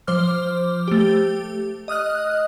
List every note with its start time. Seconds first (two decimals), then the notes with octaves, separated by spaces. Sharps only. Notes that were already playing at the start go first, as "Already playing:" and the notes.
0.07 F3 C5 D6 F6
0.88 A3 G4
1.88 D#5 D#6 F6 F#6